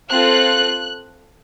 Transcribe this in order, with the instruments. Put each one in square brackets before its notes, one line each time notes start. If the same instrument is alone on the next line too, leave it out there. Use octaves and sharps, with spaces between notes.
[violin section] C4 F4 A4 F#6